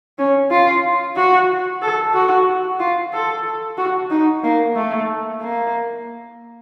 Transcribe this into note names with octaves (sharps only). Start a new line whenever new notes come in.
C#4
F4
F#4
A4
F#4
F4
A4
F#4
D#4
A#3
A3
A#3